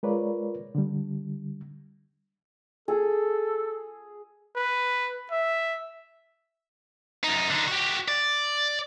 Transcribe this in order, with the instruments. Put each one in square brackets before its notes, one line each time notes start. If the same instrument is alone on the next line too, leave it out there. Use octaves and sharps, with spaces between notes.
[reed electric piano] G#3 F4 A#4 B4 C#5 D5
D3 G3
[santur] G#4 [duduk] A4
[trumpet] B4
E5
[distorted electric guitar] F#2 D#4
D3 D#4
F#4 G4
D5